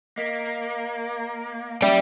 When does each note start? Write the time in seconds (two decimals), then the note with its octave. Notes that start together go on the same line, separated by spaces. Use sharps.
0.18 A#3 D#5 B6
1.82 A#3 C#4 D5 E5 G5